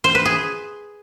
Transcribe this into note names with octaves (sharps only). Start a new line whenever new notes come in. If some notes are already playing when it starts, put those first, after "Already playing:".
C5
B4
G#4